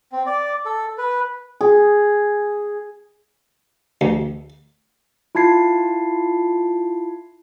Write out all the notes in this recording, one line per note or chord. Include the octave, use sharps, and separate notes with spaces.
C4
D5
A4
B4
G#4
D2
E4 F4 A5 G#6 C7